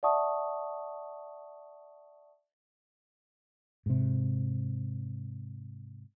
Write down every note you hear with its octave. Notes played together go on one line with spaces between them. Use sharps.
D5 E5 F#5 A5 C#6 D#6
G#2 C3